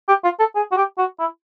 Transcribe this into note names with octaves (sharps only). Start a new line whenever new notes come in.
G4
F4
A4
G#4
F#4
G4
F#4
E4